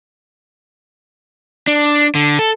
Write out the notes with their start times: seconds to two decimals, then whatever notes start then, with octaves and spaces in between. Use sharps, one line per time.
1.67 D4
2.15 D3
2.39 A4